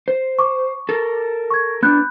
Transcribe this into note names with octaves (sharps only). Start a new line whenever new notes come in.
C5
C#6 D6
A4 A#4
C#6 G#6
B3 D4 B5 F#6 G6